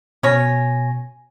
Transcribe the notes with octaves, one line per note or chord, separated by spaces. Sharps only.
B2 C#4 C#5 G#5 A#6